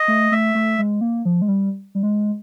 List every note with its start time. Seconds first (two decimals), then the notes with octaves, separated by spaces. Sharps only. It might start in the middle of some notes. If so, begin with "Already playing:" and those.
Already playing: D#5
0.08 A3
0.32 A3 E5
0.55 A3
0.78 G#3
1.01 A#3
1.25 F3
1.42 G#3
1.48 G3
1.95 G3
2.03 G#3